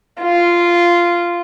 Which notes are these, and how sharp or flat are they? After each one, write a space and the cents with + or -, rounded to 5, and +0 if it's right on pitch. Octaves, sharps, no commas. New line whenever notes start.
F4 -10